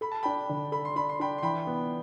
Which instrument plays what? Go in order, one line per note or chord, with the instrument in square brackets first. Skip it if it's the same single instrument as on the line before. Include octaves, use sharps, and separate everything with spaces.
[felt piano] A4 [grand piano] B5
[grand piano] A5
[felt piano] D4 [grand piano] G5 B5
[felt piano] D3
[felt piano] A4 [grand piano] B5
[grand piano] C6
[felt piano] D4 [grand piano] B5
[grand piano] C6
[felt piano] D4 [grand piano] G5 B5
[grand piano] C6
[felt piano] E3 [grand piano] G5 B5
[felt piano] B3